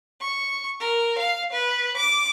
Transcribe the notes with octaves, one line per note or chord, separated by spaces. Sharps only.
C#6
A#4
F5
B4
D6